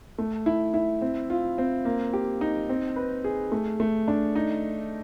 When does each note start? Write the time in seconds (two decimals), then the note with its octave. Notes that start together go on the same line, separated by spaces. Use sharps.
0.18 A3
0.46 E4
0.74 E4
1.02 C4
1.30 F4
1.58 C4
1.85 A#3
2.13 G4
2.41 D#4
2.69 C4
2.96 B4
3.24 G#4
3.52 A3
3.80 A3
4.08 D4
4.35 D#4